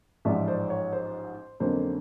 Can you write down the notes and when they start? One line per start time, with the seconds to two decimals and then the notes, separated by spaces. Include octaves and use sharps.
0.25 A1 G#2 F3 G#3 D5 E5
0.48 C5 D5
0.70 C#5
0.93 C5
1.60 F2 D3 F#3 A#3 C#4 C5